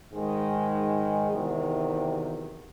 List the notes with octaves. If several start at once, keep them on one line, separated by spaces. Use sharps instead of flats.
G#2 D#3 G#3
E2 C3 D#3 F#3